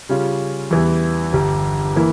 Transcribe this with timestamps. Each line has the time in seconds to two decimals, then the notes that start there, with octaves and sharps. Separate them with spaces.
0.09 C#3 G3 C#4 F4
0.71 E2 E3 G3
1.33 G1 G2 G3
1.96 E3 A#3 E4